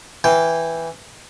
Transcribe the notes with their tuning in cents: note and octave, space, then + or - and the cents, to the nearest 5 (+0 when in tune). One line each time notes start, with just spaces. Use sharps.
E3 +0 G5 +0